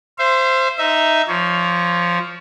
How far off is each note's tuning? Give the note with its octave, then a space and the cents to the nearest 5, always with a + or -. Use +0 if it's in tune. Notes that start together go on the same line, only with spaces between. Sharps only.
C5 +0 E5 +40
D#4 +0 E5 +0
F3 +0 C#5 +20